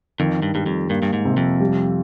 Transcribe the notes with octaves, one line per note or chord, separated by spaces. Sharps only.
F2 D#3
G2
G2 G3
F2
G2 A#3
G2
G#2
C3
F2
G3